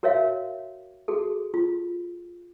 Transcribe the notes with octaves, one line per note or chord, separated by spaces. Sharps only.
F#4 A#4 C#5 E5 F5
F#4 G#4 A4
F4